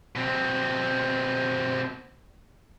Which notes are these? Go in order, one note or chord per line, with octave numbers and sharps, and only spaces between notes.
B2 C4